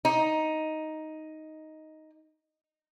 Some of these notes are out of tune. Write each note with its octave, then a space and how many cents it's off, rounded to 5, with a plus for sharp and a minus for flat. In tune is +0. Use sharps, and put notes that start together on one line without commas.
D#4 +5